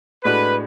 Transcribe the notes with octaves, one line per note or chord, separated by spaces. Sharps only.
A2 G#3 D4 F#4 B4